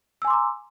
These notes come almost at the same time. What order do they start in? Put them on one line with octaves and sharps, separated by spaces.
E6 G#5 C6 D6 A#5